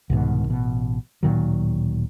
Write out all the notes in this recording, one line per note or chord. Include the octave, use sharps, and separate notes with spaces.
C2 G#2 B2 D#3
A1 B2
D1 A#2 D#3 F#3